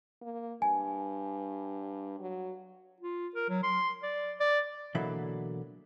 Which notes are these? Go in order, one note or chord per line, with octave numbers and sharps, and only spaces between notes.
A#3
G2 G#5
F#3
F4
A#4
F#3
C6
D5
D5
B2 D3 E3 F#3 A#3 E5